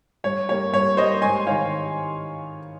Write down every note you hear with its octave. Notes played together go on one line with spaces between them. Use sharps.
G2 C#5
G3 A#3 C#5
G2 C#5
G3 A#3 C5 D#5
G#2 G#5 C6
D#3 G3 C#5 F5